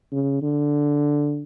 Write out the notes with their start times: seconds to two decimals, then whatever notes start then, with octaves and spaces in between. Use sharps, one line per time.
0.12 C#3
0.42 D3